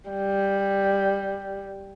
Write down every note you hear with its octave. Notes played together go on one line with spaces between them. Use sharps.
G3